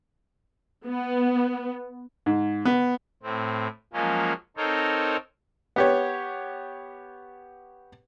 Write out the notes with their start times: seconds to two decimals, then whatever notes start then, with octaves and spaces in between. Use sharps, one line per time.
0.87 B3
2.26 G#2
2.65 B3
3.23 A2 C4
3.93 F3 F#3 G#3 A#3 C#4 F4
4.57 C4 D#4 A4 A#4 C5 C#5
5.76 B3 G4 C#5